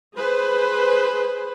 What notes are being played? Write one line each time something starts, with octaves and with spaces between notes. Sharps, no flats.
G#4 B4 C5